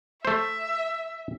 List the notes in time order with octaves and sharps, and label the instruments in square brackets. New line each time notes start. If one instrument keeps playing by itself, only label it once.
[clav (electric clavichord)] A3 C5 [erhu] E5